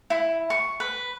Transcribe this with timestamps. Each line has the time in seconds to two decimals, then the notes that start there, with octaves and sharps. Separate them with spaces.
0.10 E4
0.50 C#6
0.80 B4